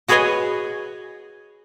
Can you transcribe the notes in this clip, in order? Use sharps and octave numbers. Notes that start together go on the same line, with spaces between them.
F#4 G#4 B4 C#5 D#5 G#5